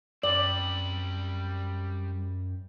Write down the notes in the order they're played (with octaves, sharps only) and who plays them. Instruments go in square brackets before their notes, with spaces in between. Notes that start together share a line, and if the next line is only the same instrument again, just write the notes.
[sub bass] F#2 [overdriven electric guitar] G3 C4 [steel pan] D5 [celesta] F#7